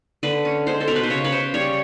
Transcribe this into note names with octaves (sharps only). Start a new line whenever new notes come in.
D3 B4
C#4
G#3 C5
A4
B2 A#4
B4
C5
C#3 C#5
B4
C#3 C5
G3 C#5